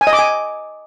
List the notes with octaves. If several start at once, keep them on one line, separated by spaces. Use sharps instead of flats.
G#5
D#5
D6
G#5